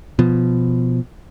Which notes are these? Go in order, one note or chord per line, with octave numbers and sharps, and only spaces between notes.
B2 F3